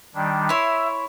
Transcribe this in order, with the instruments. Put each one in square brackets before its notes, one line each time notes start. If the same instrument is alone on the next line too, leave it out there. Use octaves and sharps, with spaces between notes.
[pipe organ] D#3 G3 D4
[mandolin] E4 C#5 C6 [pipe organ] E5